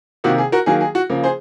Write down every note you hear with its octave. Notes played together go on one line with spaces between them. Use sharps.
C3 D#3 A#3 F#4
G#4
F#4 A#4
D#3 F#3 A#3 G#4
G#4
F#4
C#3 F3 A#3
G#4 C5